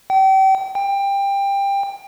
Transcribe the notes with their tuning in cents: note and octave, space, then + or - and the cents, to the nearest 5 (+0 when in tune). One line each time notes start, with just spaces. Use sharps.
G5 -35
G5 +20